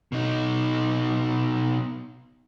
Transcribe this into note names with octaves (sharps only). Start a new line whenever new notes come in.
B2 D#4